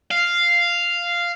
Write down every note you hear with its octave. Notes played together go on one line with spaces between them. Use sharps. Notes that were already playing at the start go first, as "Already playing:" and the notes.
F5